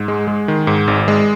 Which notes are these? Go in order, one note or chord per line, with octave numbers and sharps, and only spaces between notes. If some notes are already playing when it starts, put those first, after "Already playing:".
Already playing: G#2
G#3
G#3
D#3
G#2
G#1
G#3